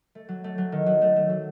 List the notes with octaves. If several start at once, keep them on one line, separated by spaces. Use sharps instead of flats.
A3
F#3
A3
F#3
D#3
F#3
A3
A3
F#3